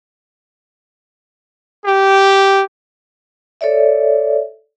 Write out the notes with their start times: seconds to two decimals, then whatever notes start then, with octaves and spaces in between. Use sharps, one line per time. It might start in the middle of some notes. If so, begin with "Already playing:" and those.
1.85 G4
3.61 A4 C#5 D5 E5